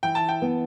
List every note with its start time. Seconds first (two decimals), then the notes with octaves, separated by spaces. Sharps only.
0.03 E3 G5
0.15 A5
0.29 G5
0.42 B3